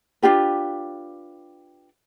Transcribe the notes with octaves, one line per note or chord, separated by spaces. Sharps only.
D4 F4 G4 B4